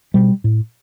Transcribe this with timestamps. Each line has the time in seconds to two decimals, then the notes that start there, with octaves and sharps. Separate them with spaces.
0.14 B2 G3
0.44 A2